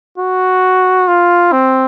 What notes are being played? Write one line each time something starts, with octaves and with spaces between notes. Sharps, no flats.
F#4
F4
C4